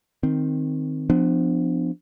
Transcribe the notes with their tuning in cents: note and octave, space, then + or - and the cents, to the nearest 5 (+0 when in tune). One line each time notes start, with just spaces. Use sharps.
D#3 +0 C4 +0
F3 +0 B3 +35 D4 +15